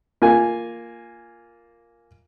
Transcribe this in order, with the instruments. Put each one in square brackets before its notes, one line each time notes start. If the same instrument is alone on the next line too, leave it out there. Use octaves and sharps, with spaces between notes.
[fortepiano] A#3 F4 G#5